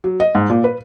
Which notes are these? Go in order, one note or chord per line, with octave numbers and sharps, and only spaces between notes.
F#3
D#5
G#2
A#2
B4